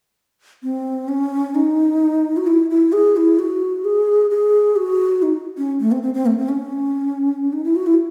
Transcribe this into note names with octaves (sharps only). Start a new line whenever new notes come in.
C4
C#4
D#4
F#4
E4
E4
G#4
E4
F#4
G#4
G#4
F#4
D#4
C#4
A3
C4
C4
C4
A3
C4
C#4
D#4
E4
F#4
E4